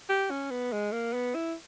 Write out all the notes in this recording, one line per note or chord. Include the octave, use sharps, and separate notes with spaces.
G4
C#4
B3
G#3
A#3
B3
E4